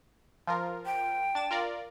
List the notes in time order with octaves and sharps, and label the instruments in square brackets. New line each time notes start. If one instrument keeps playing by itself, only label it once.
[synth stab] F3 F4 A#4
[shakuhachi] G5
[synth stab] D4 A6 E7
F4 A#4 D5